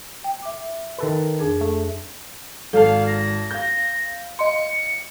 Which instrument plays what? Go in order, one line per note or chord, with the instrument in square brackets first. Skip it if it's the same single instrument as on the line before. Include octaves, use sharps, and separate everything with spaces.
[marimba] G5
E5 D6
[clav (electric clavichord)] D#3 A4 B4
[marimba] F2 D4 G#4
[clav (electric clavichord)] A3
[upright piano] G#1 A5 [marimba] A4 [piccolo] F5
[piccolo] A#6
[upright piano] F5 G6
[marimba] D#5 C6 [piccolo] C#7